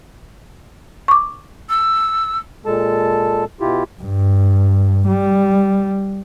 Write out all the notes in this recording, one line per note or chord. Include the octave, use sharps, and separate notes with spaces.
C#6 D6
E6
A#2 G#3 A4 A5
B2 E4 F4 G4
G2
G3